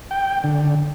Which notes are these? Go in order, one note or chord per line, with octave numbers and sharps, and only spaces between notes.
G5
D3